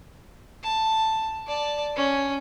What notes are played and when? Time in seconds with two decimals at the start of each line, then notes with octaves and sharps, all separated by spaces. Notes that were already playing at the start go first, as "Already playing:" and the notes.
0.63 A5
1.47 D5 A5
1.96 C#4